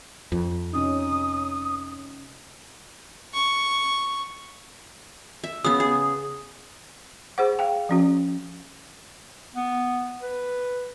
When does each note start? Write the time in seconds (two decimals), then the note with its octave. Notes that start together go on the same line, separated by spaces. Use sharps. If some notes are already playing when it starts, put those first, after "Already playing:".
0.32 F2
0.73 C3 C#4 D#4 D#6
3.34 C#6
5.44 E5
5.65 C#3 B3 D#6
5.80 G#4
7.38 G#4 C5 F#5
7.59 F5 G5
7.89 F3 C#4 F#4
9.56 B3
10.21 B4